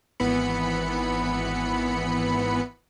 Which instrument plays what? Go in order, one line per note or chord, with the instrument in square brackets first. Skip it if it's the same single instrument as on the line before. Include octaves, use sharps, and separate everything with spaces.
[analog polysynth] G#1 E3 B3 B5 C#7